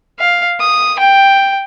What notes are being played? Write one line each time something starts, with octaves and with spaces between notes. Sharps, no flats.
F5
D#6
G5